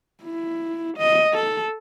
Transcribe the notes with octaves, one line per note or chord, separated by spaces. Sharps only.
E4
D#5
A4